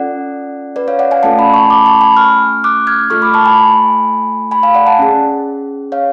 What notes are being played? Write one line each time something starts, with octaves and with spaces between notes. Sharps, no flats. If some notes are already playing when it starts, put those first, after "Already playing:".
Already playing: C#4 F4 A4 D5 F#5
B4 D5
C#5 F5
D5 F#5
F5 G#5
A3 C#4 F4 A4 F#5 A5
G#5 B5
A5 C#6
B5 D6
A5 C#6
G#5 B5
C#6 F6
D6 F#6
F6 G#6
A3 F4 A4 C#6 F6
B5 D6
A5 C#6
G#5 B5
G#5 B5
F5 G#5
D5 F#5
F#5 A5
C#4 G#4
C#5 F5